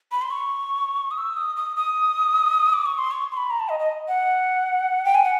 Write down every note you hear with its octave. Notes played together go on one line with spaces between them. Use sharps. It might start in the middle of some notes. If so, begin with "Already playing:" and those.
B5
C6
C#6
D#6
E6
D#6
D#6
D#6
D6
C#6
C6
C#6
C6
B5
A#5
A5
D#5
D#5
F#5
G5
G#5
F#5